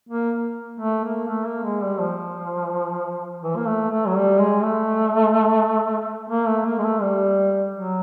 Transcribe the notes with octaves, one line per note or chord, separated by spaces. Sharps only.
A#3
A3
A#3
A3
A#3
G#3
G3
F3
E3
A#3
A3
A3
F#3
G3
G#3
A3
A#3
A3
A#3
G#3
A3
G3
F#3